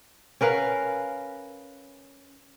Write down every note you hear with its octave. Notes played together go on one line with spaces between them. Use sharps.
C#4 A#4 B4 F5